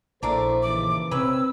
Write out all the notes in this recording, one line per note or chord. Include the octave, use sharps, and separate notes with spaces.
A#1 A3 D4 E4 A4 A#4 C5 D6
D#2 C#3 E3 D6
C3 C4 B4 C#5 E6